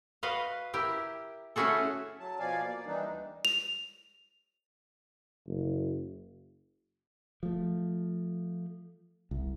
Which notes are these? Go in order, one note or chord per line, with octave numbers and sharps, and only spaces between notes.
F#4 B4 D#5 F5
E4 G4 A#4
A3 C#4 E4 F#4 G#4 A4
F#3 A5
B2 F3 D5 F5 G#5
A#3 D5
D#3 E3 G3 D4 D#4
D2
F7
F#1
F3 A3
C2